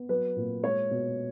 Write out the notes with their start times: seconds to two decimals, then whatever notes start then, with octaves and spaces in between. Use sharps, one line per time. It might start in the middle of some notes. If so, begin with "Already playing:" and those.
Already playing: B3
0.09 F#3 B4
0.36 A#2
0.64 G#3 C#5
0.91 B2